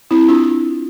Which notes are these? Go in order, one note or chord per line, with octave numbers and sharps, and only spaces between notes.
C4 E4
D4 F4